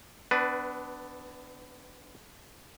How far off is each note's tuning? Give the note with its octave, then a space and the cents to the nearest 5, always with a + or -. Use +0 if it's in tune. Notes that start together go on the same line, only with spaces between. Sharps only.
B3 +30 D4 +0 B4 +0